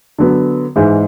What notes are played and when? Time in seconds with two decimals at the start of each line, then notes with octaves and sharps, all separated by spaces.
0.19 D3 F#3 B3
0.76 G#2 E3 G#3